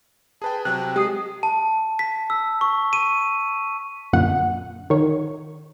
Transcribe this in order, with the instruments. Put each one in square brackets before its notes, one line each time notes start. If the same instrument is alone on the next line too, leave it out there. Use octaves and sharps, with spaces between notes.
[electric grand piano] G#4 B4 G5 [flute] A5
[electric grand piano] C3 F#3 [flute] G5 [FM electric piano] F#6
[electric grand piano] G#3 [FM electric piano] G4 D#6 C7
[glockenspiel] A5
B6
E6
C#6
D#7
[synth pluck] F#2 A#2 D3 F#5
D#3 C#5